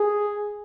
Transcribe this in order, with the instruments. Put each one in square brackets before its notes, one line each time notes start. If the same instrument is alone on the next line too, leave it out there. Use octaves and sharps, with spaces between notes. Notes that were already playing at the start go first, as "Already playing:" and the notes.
Already playing: [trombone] G#4